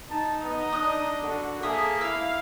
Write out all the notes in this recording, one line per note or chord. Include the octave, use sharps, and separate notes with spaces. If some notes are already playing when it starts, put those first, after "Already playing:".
D#4 A5
B3 D#5
D4 D#6 F#6
D3 F#4
A#3 G#4 A4 E5 D#6
E4 F5 E6